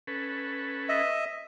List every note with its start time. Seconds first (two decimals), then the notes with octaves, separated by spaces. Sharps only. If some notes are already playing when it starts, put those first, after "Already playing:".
0.07 C#4 A4 B4
0.89 D#5 E5